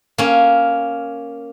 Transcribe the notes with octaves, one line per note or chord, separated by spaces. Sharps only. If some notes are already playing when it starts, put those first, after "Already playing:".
A#3 C#4